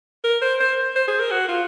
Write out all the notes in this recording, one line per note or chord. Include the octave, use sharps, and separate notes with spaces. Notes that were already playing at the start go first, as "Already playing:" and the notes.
A#4
C5
C5
C5
G#4
A#4
F#4
F4